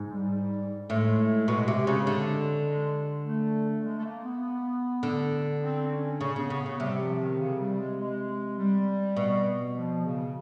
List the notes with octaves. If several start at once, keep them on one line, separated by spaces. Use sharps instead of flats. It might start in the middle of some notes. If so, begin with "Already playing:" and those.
Already playing: G#2
G3
A2 G#3
B2
C3
C#3
D3
G#3
A3
G#3
A3
A#3
B3
D3
C4
C4
C#4
C#3 C#4
C#3 B3
C#3 B3
C#3 B3
C3 G3
F3
D#3
C#3
G3
G#3
G#3
G3
B2
F3
C#3